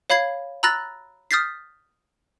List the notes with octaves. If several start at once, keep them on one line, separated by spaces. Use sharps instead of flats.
C#5 F5 B5 G#6 C7
A#5 B5 E6 F#6 A6 A#6
D#6 F6 G6 A6 B6 C7